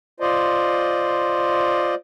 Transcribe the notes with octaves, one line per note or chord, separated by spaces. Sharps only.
F4 C5 D5 D#5